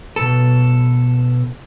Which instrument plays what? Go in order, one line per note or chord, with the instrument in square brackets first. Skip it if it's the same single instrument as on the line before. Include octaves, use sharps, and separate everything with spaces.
[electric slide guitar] B2 A4